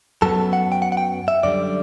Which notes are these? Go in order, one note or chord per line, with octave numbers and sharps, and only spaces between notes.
F#2 F#3 B3 A4
F#5
G5
F#5
F#5
G5
E5
F#2 D3 G3 D5